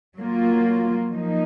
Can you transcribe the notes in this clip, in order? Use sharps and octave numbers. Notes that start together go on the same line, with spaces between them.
F#3 A#3 F4
F3 A#3 D#4